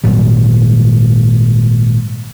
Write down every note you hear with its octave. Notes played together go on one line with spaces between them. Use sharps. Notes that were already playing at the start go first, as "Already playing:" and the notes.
G#1 A#2 F#3 G3